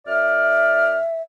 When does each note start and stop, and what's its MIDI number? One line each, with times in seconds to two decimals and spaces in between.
0.07 0.96 42
0.07 0.96 74
0.07 1.22 76
0.07 0.96 89